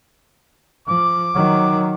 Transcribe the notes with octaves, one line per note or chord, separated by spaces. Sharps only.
F3 D6
D#3 F#3